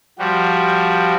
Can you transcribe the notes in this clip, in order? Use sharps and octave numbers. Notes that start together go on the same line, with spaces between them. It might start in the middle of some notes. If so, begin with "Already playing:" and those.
F3 G3 F#4